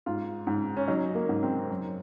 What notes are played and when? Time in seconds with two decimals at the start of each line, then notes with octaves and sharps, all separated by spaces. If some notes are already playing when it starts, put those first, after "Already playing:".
0.06 G#2 F4
0.47 G#2
0.77 C#4
0.88 F#3 D#4
1.15 A#3
1.29 G#2
1.43 C4
1.70 F#2